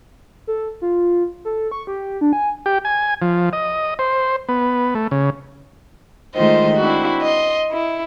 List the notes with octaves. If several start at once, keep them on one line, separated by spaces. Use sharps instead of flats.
A4
F4
A4
C#6
G4
D4
G#5
G4
G#5
F3
D#5
C5
B3
A3
C#3
D#3 G#3 A3 F4 C5 D#5
C4 D4 E4 F#4
D#5 C6
E4